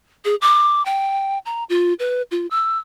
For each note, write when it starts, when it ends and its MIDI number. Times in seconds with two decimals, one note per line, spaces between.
0.25 0.35 68
0.41 0.84 86
0.85 1.38 79
1.45 1.64 82
1.69 1.94 65
1.99 2.22 71
2.31 2.47 65
2.51 2.78 88